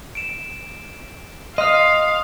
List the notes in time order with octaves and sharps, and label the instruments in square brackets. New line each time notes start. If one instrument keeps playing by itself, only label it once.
[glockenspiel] D7 E7
[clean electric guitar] D#5 [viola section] F5 [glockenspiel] C6 D#6 F6